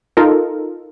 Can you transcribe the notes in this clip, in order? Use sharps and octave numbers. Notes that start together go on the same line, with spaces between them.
D#4 F4 A4 A#4